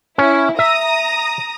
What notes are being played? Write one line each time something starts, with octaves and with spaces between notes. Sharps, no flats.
C#4 E4
E5 A#5 D#6 A#6